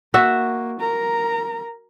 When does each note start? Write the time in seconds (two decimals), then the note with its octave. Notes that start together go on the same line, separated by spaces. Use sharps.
0.14 A#3 F#4 E5
0.81 A#4 A#5